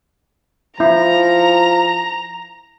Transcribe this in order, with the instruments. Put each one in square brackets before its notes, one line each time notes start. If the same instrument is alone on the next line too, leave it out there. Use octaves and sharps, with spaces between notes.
[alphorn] F3 [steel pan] E4 [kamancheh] A#5